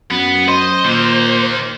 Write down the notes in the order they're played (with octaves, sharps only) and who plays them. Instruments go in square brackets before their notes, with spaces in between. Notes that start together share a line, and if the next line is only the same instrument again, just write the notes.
[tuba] F#2 [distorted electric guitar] B3
[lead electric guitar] C5 [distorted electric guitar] D#5
[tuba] A#2 [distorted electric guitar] D#3 A#3